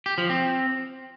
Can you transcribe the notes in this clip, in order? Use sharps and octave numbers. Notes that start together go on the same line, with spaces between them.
G4
F3
C4